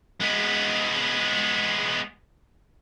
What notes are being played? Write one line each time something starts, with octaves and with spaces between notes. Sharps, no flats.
G#3 B3